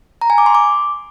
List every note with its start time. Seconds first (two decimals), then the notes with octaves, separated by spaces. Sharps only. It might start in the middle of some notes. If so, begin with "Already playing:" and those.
0.21 A#5
0.30 G#5
0.38 D6
0.46 C6
0.55 D6